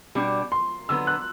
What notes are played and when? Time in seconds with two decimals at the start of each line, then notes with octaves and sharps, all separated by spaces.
0.15 B2 G3 D4
0.52 C6
0.89 D3 F#3 B3 E6
1.07 F#6